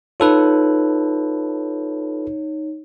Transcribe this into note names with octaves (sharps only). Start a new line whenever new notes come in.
D#4 F4 A4 B4 C#5